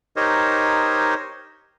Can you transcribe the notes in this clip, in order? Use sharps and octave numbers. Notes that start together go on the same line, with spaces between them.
D#4 G4 A#4 C5 C#5 D#5